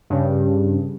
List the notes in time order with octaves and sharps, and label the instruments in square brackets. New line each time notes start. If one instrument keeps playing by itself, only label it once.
[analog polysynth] G2 C#3